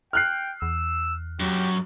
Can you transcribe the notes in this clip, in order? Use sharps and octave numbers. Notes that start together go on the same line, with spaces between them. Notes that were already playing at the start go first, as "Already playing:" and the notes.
G5 F6 F#6 C7
E2 E6
F#2 F#3 G4